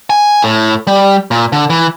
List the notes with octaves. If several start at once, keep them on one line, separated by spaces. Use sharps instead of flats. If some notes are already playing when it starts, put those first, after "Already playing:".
G#5
A2
G3
A#2
D3
E3